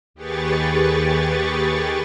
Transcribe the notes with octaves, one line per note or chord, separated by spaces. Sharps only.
D#2 G4 G#4 B4 C#6 A6